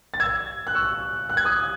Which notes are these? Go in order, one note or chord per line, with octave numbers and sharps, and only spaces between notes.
A6
E6 G#6
F#6
C#6 E6
F#6
G#6
D#6 F#6